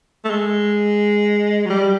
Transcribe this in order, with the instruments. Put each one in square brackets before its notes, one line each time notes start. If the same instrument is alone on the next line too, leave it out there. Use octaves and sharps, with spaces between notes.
[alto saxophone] A3
G#3
F#3
G3